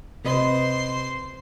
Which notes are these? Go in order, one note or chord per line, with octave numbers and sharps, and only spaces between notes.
C3 B4 C5 D#5 C6